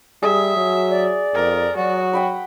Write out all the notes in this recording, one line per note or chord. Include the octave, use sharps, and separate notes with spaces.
G3 G#4 E5
F#3
D5
F2 A#4
F#3 F#4
F#5 G5 B5